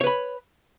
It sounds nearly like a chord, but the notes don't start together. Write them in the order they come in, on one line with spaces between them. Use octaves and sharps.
C#5 B4 B5